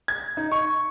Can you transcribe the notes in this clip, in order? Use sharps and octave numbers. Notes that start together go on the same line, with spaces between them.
G#6
D#4
C#6